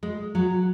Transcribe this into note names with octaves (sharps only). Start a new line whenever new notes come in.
G#3
F#3